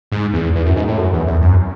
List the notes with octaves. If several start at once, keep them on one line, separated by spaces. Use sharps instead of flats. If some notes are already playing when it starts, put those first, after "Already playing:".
G#2
E2
E2
F#2
G#2
A2
F#2
E2
E2
F#2